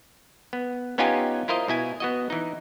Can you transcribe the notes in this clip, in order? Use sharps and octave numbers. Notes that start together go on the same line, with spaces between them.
B3
B3 C#4 D#4 F4 G4 G#5
E4 F4 A#4 C5 D#5
B2 E4 G#5
B3 F#4 D#5
E3 D#4